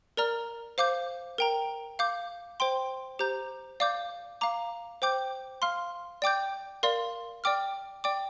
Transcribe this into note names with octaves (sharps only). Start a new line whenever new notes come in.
A#4 D5 A#5 F6
C5 F5 D6 G6
A#4 G5 A#5
F5 D6 G6
C5 G5 C6
G4 C5 A#5 G6
D5 F5 D6 G6
F5 A#5 D6
C5 G5 D6 G6
F5 C6 F6
D5 G5 D6 G6
A#4 D5 F5 C6
D5 G5 D6 F6
D5 G5 D6